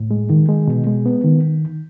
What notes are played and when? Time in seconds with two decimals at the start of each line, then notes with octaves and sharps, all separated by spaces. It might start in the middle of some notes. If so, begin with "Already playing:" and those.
Already playing: A2
0.11 G#3
0.30 D#3
0.49 G#3
0.67 B2
0.87 G#3
1.06 B3
1.24 D#3